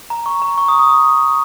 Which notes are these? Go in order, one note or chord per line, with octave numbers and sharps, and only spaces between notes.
A#5
C#6
A#5
C#6
D#6
D#6
D#6